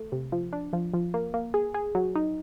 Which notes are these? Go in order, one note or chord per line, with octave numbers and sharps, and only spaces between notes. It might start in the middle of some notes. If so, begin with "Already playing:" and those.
Already playing: A3
C3
F3
D4
F3
F3
A#3
A#3
G#4
G#4
F#3
D#4